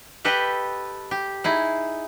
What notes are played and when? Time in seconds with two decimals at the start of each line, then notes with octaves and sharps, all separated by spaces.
0.25 G4 A4 B4 D#5 G5
1.11 G4
1.44 D#4 E4 G#4